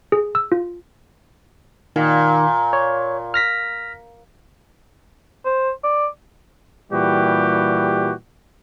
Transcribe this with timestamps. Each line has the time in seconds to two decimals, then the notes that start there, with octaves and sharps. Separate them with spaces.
0.12 G#4
0.35 E6
0.52 F4
1.96 A#2 D#3
2.73 C#5
3.34 F6 A#6 B6
5.45 C5
5.84 D5
6.92 A#2 E3 G3 F#4 G4